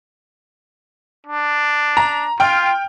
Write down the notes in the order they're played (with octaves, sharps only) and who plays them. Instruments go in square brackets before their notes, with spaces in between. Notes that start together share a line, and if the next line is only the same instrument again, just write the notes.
[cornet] D4
[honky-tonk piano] A#5
[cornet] F4 [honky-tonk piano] G5 F6